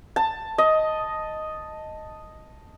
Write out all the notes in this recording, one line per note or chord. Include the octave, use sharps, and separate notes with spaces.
A5
D#5